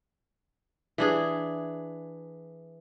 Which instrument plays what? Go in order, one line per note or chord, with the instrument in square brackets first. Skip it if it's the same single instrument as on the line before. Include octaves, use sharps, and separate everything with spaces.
[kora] E3 D4 G#4